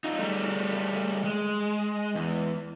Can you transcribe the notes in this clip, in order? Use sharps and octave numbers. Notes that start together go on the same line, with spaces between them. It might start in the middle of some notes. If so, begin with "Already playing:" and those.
D#4 F4
G3 A3
G#3
E2